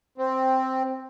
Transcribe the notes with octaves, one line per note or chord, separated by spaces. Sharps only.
C4